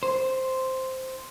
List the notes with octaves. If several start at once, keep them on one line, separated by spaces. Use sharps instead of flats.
C5